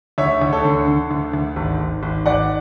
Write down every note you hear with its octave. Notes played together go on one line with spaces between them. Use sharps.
D2 C#5 E5
D2
A4 C#5
D3
D3
D2
D2
G#1
G#1
G#1
G#1 D5 F#5